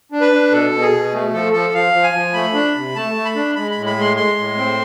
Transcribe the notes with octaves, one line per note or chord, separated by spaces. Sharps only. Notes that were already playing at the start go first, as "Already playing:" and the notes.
D4
B4
D4
B2 A4
B2
G#4
B2
A3
F3 A4
F3 A4
F3 F5
F3
G#5
F3
A3 B5
D4
C3
A3 A5
A3
B5
D4
G#3 B5
A2 B5
B5
G#3 C6
G#3 C6
A2
C4